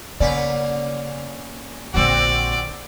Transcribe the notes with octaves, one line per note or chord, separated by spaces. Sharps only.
C#3 A#3 C#4 D5
A#1 D3 C4 F#4 D5